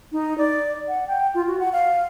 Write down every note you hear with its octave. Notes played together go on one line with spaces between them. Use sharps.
D#4
D5
F#5
G5
F4
F#4
F#5
F5